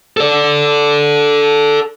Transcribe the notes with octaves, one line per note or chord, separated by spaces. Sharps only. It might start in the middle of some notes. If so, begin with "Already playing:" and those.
A4 D5